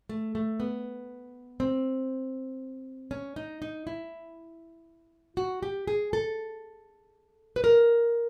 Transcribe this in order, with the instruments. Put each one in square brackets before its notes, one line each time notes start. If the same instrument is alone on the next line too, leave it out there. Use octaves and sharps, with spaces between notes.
[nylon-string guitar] A3
A3
B3
C4
C#4
D#4
D#4
E4
F#4
G4
G#4
A4
B4
A#4